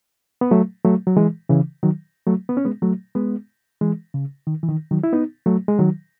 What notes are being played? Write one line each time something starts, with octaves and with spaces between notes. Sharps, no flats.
B3
F#3 A3
F#3 A3
F#3
E3 G#3
C#3 E3
D#3 F#3
F#3 A3
B3
C#4
G#3 B3
F#3 A3
G#3 B3
E3 G#3
C#3
D#3
E3
D#3
D#3 F#3
E4
B3 D#4
F#3 A3
G#3
D#3 F#3